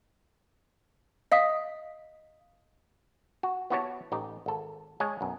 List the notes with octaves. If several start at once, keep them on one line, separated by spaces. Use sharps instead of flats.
D#5 F5 D#6 B6
F#4
B3 E4 F#4 G4 C#5 A5
A1 D#4 G4
G#1 A4
G#3 C#5 G#5 A5
B1 F#2